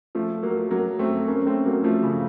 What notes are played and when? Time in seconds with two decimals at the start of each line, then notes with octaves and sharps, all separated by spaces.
0.15 F3 A3
0.43 F#3 A#3
0.71 F#3 A#3
0.99 A3 C4
1.28 A#3 C#4
1.46 A3 C4
1.65 F#3 A#3
1.84 F3 A3
2.03 C#3 F3